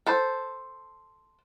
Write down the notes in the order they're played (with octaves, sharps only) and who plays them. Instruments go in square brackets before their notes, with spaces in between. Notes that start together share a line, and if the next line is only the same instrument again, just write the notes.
[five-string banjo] A4 C5